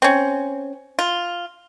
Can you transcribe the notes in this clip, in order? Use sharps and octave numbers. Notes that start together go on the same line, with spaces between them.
C4 C#4
F4